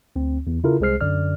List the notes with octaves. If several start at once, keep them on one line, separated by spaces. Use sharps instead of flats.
D2 C4
E2
C#3 E4 F4 A4 A#4
C2 G#3 G#4 C5 F6 C7
F#2 D3 D5 F6